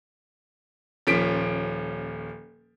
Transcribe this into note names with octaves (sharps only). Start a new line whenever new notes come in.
D#1 F3 C#4 B6 D7